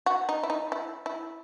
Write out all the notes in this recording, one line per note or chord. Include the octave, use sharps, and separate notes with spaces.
F#4
D#4
E4
D#4
E4
E4